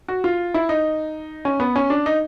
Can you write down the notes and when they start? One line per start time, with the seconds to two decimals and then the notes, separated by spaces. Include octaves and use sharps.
0.08 F#4
0.24 F4
0.54 E4
0.69 D#4
1.45 C#4
1.60 B3
1.76 C#4
1.90 D4
2.06 D#4